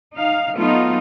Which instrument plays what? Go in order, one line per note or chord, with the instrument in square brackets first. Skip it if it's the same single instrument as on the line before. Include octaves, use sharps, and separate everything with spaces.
[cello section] D#4 F5
F#3 A3 B3 D#4 F4